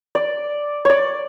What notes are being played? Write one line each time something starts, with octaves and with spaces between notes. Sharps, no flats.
D5
C#5 D5